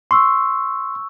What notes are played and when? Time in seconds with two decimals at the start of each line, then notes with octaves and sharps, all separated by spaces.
0.11 C6 C#6 E6